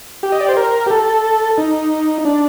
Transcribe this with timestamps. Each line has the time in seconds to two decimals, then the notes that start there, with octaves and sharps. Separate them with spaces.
0.23 G4
0.32 D#5
0.41 D5
0.48 C5
0.57 A#4
0.86 G4
0.90 A4
1.58 D#4
2.25 D4